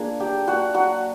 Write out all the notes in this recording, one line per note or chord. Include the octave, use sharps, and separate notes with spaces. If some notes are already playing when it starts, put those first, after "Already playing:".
Already playing: A#3 D4 F4 G#4
F#3 G4 G5
A#3 D4 F4 F#4 F#5
F#3 F#4 F#5